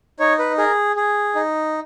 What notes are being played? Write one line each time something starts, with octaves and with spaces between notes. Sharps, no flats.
D#4 C#5
B4
G#4 A#4
G#4
D#4